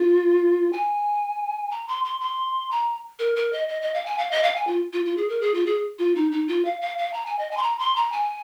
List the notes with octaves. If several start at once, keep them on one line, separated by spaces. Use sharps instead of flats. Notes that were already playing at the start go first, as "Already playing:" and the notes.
Already playing: F4
G#5
A#5
C6
C6
C6
A#5
A#4
A#4
D#5
D#5
D#5
F5
G#5
F5
D#5
F5
G#5
F4
F4
F4
G#4
A#4
G#4
F4
G#4
F4
D#4
D#4
F4
F5
F5
F5
A#5
G#5
D#5
G#5
C6
A#5
C6
A#5
G#5